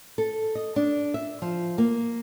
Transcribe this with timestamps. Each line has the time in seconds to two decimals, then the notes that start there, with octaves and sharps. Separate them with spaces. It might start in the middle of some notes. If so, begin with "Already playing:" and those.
0.18 A4
0.55 D#5
0.76 D4
1.14 E5
1.42 F3
1.78 A#3